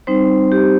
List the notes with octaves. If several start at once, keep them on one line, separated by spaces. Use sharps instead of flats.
G3 C4 D#4 C5
G4